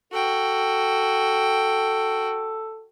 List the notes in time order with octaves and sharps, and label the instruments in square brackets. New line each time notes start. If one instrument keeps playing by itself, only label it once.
[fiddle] F#4 G5 [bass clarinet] A4